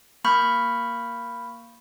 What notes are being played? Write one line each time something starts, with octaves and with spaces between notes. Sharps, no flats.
A#3 B5 C#6 F6 G6